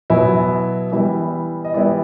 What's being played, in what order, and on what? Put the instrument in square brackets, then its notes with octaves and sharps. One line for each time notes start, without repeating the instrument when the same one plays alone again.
[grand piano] B2 F#3 B3 E4 G#5
E3 G3 B3 E4 E5
D#5
E3 G3 B3 E4 D5